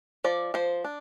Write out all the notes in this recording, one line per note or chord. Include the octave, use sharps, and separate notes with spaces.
F3 D5
F3 C5
D4